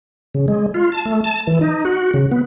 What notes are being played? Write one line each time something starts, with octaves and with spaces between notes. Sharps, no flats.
C#3
G#3
F4
A5
A3
A5
E3
D#4
F#4
C#3
B3